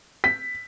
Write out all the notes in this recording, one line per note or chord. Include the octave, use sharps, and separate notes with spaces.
B6